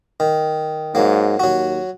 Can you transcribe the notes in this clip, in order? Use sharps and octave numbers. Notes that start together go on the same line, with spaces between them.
D#3
G#2 F#3 A#3
D#2 F#3 F#4